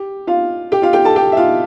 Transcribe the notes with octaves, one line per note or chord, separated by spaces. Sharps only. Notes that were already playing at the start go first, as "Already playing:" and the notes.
Already playing: G4
F4 F5
G4 G5
F4 F5
G4 G5
A4 A5
G4 G5
E5
F4 F5